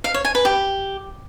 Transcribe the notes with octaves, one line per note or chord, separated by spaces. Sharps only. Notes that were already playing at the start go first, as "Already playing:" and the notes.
F5
C#5
G#5
B4
G4